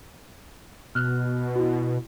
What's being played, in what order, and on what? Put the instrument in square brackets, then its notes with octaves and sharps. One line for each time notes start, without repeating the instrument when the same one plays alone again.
[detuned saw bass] B2 [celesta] F6 F#6
[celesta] E4 F#4